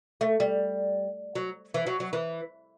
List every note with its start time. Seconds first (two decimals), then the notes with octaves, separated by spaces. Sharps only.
0.21 A3
0.40 G3
1.35 F#3
1.74 E3
1.87 F#3
2.00 F#3
2.13 E3